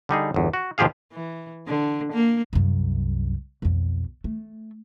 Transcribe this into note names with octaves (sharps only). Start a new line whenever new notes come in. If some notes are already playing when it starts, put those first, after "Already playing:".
D3 G3 D#4 G#4
G1 E2
F#4
D#2 B2 F3 G4 G#4 F5
E3
D3
A#3
C2 F#2
B1 F2
A3